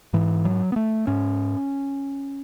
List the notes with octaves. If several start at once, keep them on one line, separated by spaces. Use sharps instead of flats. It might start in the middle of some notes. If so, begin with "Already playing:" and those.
G#2 E3
F#3
B3
A3
G#2 C#4